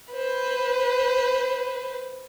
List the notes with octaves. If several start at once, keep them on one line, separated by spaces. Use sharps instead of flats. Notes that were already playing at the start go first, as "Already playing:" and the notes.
B4 C5